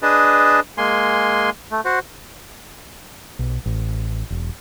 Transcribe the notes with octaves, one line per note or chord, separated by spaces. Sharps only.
D4 G#4 B4 D#5 A5
G#3 A#3 G#5 C6
A3
F#4 C5
B1
A1
E1